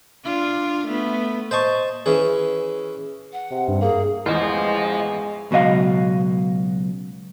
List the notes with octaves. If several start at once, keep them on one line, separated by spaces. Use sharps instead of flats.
D4 F4
A3 B3
C5 D#5 A5 C#6
E3 C#4 G#4
F#5
C3
G2
A#3 G#4
A1 E2 G#3 F4 C5 D#5
C#2 B2 F#3 D#5 F5